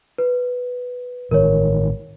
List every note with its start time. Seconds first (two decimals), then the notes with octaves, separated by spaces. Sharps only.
0.18 B4
1.31 A1 D#3 A#4 C#5